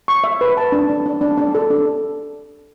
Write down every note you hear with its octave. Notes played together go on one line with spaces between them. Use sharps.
C#6
E5
B4
A5
D4
D4
D4
D4
D4
A4
D4